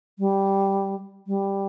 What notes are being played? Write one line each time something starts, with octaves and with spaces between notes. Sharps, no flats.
G3
G3